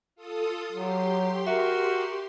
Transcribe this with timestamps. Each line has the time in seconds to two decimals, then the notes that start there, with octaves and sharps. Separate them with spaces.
0.15 F4 A4 D#6
0.72 F#3 G4 C6
1.47 F#4 A#4 E5